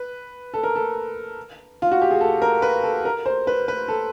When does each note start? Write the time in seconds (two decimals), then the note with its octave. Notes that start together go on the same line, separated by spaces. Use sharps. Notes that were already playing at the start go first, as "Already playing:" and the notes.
Already playing: B4
0.54 A4
0.63 A#4
0.75 A4
1.82 F4
1.91 F#4
2.02 G4
2.11 G#4
2.21 A4
2.42 A#4
2.62 B4
2.83 A4
3.05 A#4
3.26 C5
3.47 B4
3.68 B4
3.88 A4